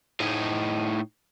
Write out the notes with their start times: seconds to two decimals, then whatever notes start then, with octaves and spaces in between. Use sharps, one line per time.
0.20 A2 D#4